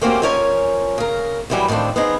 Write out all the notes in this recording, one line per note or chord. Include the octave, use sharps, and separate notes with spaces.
A3 A#3 C4 C#4 F#4 G4
F3 C#4 A#4 C#5 E5 G#5
C#3 A#4
E2 A2 E3 F#3 G3 B4
A2 D#3 F3 C4 D4
B3 C4 D#4 G#4